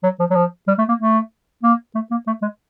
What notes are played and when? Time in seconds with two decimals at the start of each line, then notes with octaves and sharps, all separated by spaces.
0.03 F#3
0.19 F3
0.30 F#3
0.35 F3
0.67 G3
0.78 A3
0.88 A#3
0.99 A3
1.63 A#3
1.95 A3
2.11 A#3
2.27 A3
2.42 G#3